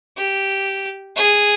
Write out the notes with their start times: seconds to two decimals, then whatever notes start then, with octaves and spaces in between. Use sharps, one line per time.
0.17 G4
1.16 G#4